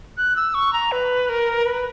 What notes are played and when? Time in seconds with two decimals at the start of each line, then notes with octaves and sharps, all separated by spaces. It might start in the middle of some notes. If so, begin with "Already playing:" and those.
0.17 F#6
0.36 E6
0.54 C#6
0.73 A#5
0.92 B4
1.29 A#4
1.66 B4